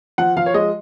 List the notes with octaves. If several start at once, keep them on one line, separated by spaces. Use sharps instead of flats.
F3 F#5
F3 F5
C#5
G#3 D#5